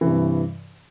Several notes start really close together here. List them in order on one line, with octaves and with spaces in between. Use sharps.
E3 C3 G2